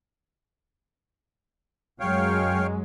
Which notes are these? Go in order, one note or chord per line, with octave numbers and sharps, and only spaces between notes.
F#2 F#3 G#3 C#5 F5 G5